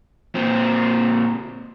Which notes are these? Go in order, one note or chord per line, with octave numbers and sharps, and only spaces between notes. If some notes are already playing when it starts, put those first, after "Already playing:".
A#2 C4